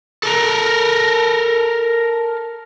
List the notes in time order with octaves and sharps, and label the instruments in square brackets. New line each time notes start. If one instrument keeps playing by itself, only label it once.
[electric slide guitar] A4 A#4